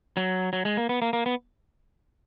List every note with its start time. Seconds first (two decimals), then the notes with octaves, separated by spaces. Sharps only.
0.17 F#3
0.53 F#3
0.65 G#3
0.77 A#3
0.89 B3
1.02 A#3
1.13 A#3
1.26 B3